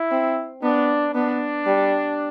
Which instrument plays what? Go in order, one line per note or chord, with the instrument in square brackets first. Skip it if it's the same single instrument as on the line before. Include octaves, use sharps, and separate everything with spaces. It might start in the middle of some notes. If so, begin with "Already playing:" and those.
Already playing: [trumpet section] E4
[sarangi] C4
[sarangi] B3 [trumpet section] D4
[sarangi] B3 [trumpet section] D4
[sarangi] G3